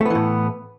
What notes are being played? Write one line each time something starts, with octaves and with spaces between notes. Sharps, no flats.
A2 E3 A3 B3